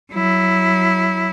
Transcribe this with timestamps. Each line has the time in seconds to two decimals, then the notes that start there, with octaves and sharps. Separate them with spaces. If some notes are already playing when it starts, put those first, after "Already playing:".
0.12 F#3 E4